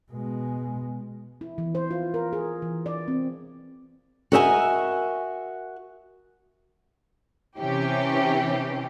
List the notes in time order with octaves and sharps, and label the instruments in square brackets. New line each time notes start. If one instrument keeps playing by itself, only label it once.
[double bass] B2 G#3
[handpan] E4
E3
C5
F4
A#4
G#4
E3
D5
C4
[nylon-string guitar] F#4 A#4 D#5 E5 G5 G#5
[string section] C3 E3 C#4 G4